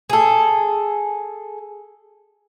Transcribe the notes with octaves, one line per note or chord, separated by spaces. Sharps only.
G#4 A4